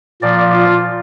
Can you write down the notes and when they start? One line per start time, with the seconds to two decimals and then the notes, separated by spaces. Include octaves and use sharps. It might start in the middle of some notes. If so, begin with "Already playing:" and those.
0.22 A#2 F3 D5
0.53 F4